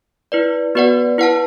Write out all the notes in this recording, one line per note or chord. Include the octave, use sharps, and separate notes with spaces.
E4 B4 D5
B3 F#4 B4 D5 F#5
E4 B4 F#5 A5